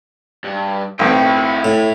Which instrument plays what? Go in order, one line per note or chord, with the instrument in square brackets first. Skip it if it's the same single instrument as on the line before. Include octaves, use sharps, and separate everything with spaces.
[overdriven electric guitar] G2
[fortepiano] B1 A2 C4 [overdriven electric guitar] E4 G5
[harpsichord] A2